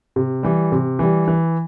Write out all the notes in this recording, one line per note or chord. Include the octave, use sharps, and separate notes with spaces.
C3
E3 G3
C3
E3 G3
E3